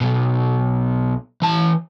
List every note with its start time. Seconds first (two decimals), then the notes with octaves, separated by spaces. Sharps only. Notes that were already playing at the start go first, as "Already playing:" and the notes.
0.01 B1 B2
1.42 E3 A5